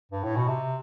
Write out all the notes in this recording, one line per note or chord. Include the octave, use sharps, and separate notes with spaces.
G2
A2
B2
C3